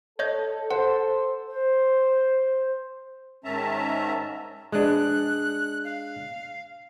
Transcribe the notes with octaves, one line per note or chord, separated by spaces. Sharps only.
A4 C#5 D#5 G6
C5 F#5
C5
G#2 D#3 C#4 E5 A5 A#5
G#3 D4 F#6
F5